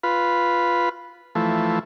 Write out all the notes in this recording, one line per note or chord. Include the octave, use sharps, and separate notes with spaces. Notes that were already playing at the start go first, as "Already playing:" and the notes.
F4 B4
E3 F3 A3